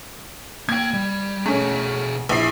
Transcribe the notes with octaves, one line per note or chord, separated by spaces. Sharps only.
A#3 G5 G#6
G3
B2 A3 C#4 G#4
A#1 E4 C7